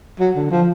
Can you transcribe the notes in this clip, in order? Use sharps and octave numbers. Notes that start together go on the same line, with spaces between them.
F#3
D3
F3